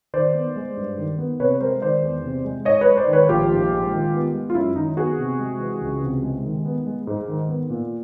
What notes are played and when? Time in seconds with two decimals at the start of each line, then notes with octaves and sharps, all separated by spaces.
0.13 D#3 C5 D5
0.35 B3
0.56 G#3
0.77 G2
0.98 D#3
1.18 B3
1.40 C3 B4 C#5
1.61 G#3 A#4 C5
1.82 D#3 C5 D5
2.03 E2
2.24 C3
2.45 G#3
2.65 G#2 C#5 D#5
2.81 B4 C#5
2.87 G#3
2.97 C5 D5
3.08 D#3
3.13 B4 C#5
3.29 A#1 F4 G4
3.50 G#2
3.71 G#3
3.92 D#3
4.13 B3
4.34 G#3
4.50 F4
4.55 F#2 E4
4.75 D#3 D#4
4.97 B3 F#4 G#4
5.19 C3
5.39 G#3
5.59 E3
5.81 C#2
6.02 C3
6.23 G#3
6.44 D#3
6.65 B3
6.86 G#3
7.07 G#2
7.28 D#3
7.49 B3
7.70 A#2